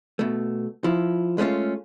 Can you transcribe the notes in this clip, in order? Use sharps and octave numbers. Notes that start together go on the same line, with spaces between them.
B2 A3
F3 E4
G#3 A3 C#4 F4